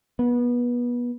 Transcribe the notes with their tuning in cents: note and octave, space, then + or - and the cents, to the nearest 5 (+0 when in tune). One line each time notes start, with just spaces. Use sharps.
B3 -25